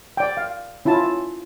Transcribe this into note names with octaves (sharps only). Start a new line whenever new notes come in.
D5 G5
F5
C#4 E4 F4 A5